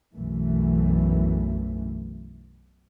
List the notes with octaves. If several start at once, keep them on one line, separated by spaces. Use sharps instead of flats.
B1 F#2 E3 A3